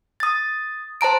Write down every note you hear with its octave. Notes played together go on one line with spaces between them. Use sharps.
D#6 A6
C5 A5 A#5 D7